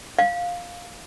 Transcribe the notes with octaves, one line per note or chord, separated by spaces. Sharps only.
F5